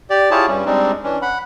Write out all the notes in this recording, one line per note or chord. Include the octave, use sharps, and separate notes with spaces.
G4 D5
E4 F4 G4 G#4 C#5 A5
G2 G3 C#4
G3 G#3 C4 D4 D#4
E3 C#4 D4
F#5 B5